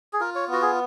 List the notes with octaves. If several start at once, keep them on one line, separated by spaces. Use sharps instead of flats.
G#4
F4 A#4
C#5
B3
F#4
G#4